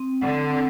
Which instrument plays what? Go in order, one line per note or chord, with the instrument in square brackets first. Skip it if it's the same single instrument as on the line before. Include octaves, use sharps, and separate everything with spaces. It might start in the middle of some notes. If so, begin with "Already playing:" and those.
Already playing: [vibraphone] C4
[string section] D3 [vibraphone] F#5
[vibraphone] C4